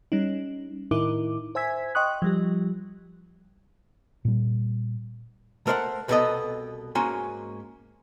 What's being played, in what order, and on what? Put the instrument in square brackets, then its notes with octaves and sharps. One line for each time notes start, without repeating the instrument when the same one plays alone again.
[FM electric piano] G3 C#4 D#4
A2 D#3 D#4 E4 A#4 D6
C5 E5 G#5 E6 G#6 B6
D#5 G5 C6 C#6 D#6 F#6
F3 G3 G4
[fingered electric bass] A#2 G3
[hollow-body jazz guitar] A3 A#4 C5 E5 F#5
C2 B2 B3 D4 A4 D#5
G#2 A#3 C#4 F#4 G#5 C6